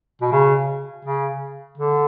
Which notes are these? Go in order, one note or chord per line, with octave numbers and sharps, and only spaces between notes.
B2
C#3
C#3
D3